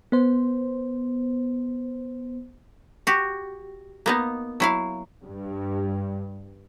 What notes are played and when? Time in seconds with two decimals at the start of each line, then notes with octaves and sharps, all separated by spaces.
0.12 B3 C5
3.07 F#4 G4
4.06 A#3 B3 D#4
4.60 F#3 E4 F5
5.24 G2